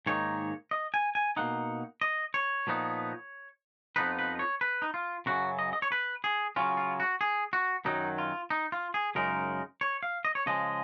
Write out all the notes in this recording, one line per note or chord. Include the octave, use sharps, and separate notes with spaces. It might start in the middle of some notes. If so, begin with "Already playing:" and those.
G#2 D#3 A#3 D#4 C#5
D#5
G#5
G#5
B2 A#3 D#4 F#5
D#5
C#5
A#2 F3 B3 D#4
F2 F3 B3 D#4 B4
B4
C#5
B4
D#4
F4
F#2 C#3 F#3 F#4
D#5
D#5
C#5
B4
G#4
C#3 F#3 C#4 F4
F4
F#4
G#4
F#4
F#2 D#3 F#3 D#4
F4
D#4
F4
G#4
F#2 C#3 G#3 D#4 A#4
C#5
F5
D#5
C#5
C#3 F3 G#3 D#5